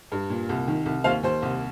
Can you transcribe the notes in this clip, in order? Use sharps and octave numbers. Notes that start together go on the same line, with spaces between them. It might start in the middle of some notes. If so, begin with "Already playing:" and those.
G2
A#2
C2
D#3
C2
D#2 C5 F5
D#2 C5
C2